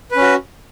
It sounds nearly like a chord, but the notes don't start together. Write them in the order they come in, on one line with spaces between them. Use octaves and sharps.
B4 C#4 F#4